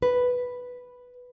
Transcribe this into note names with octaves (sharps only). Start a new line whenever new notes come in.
B4